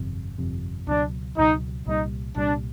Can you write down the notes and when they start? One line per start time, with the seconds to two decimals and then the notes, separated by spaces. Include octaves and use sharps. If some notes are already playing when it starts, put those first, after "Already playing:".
Already playing: G1 F2 C3
0.38 G1 F2 C3
0.87 C#2 B2 F#3 D4
1.37 C#2 B2 F#3 D#4
1.86 C2 A#2 G3 D#4
2.36 C2 A#2 G3 D4